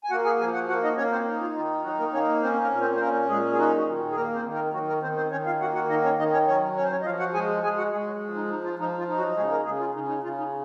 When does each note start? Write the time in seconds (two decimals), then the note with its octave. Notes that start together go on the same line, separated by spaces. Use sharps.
0.04 G#5
0.11 A#3 F#4 F#5
0.25 G#4 G#5
0.40 F3 G#4 G#5
0.54 F#4 F#5
0.69 A#3 F#4 F#5
0.83 D#4 D#5
0.97 A#3 C#4 C#5
1.12 C4 C5
1.27 D#4
1.41 F4
1.55 D#3 F4
1.84 F#3 D#4 F#4
1.99 A#3 A#4
2.13 A#3 C#4 C#5
2.42 C4 C#4 C5
2.61 A#3 A#4
2.71 A#2
2.81 C4 C5
2.96 C5
3.00 A#3 C#4 A#4
3.29 A#2 G#3 G#4
3.53 G#4
3.58 F#3 D#4 F#4
3.77 F#3 F#4
3.87 D#3
4.11 G#4
4.16 A#3 A#4
4.35 C4 C5
4.45 D#3
4.54 A#3 A#4
4.73 D#3 F#3 F#4
4.88 A#3 A#4
5.02 D#3 C4 C5
5.17 C4 C5
5.31 D#3 C#4 C#5
5.46 F4 F5
5.60 A#3 F#4 F#5
5.75 F#4 F#5
5.89 D#3 D#4 D#5
6.04 C#4 C#5
6.18 D#3 D#4 D#5
6.32 C#4 C#5
6.47 F#3 C#4 C#5
6.76 C#4 C#5
6.84 C5
6.91 C#4 C#5
7.01 D#5
7.05 F3 F4 F5
7.19 F#4 F#5
7.34 G#3 G#4 G#5
7.63 G#3 G#4 G#5
7.77 F#4 F#5
7.92 G#3 G#4
8.06 F#3 F#4
8.21 F3
8.35 D#4
8.50 D#4
8.64 F4
8.79 F3 D#4
8.98 F4
9.08 D#4
9.17 F#3 F#4
9.36 C#3 G#3 G#4
9.51 A#3 A#4
9.65 C#3 G#3 G#4
9.80 F4
9.94 C#3 D#4
10.08 D#4
10.23 C#3 F4
10.38 D#4